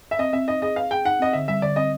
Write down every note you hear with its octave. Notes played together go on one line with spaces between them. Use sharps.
E5
C4 D#5
C4 E5
D#4 D#5
G#4 D#5
B4 F5
G#4 G5
D#4 F#5
C4 D#5
D3 E5
G3 E5
D3 D5
C4 D#5